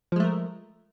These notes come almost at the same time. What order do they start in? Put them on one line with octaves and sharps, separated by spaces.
F3 G#3 A3 A#4